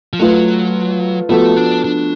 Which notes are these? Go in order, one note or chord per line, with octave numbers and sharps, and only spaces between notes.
F3
F#3 A3 F4 B4
F3 A3 B3 F#4 A4
D4
D4